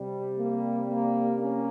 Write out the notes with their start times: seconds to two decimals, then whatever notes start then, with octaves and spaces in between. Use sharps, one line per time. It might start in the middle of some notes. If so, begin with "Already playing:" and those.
Already playing: C3 G3
0.38 A#3
0.89 A#3
1.39 A#3 C#4